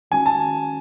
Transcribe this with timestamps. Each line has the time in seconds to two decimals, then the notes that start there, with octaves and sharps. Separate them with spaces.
0.11 D#3 G#3 C#4 F#4 G#5
0.26 A5